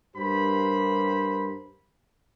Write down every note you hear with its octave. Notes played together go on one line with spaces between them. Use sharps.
G2 G4 A#4 C5 B5